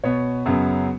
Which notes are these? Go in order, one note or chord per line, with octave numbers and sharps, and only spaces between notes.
B2 B3 C#5
F#2 C#3 F#3 B3